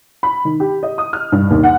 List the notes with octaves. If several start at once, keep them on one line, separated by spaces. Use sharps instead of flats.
B5
D#3
G4
D#5
D#6
F6
G2
D#2
F#5